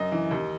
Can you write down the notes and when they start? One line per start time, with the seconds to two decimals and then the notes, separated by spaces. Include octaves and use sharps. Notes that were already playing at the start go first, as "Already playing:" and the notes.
Already playing: F#2 D#5
0.12 E3
0.31 D#2